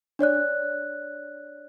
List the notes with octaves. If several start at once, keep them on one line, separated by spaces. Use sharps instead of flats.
D4 C#5 D5 F#6